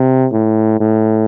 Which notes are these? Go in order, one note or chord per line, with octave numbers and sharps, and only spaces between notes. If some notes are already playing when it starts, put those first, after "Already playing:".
Already playing: C3
A2
A2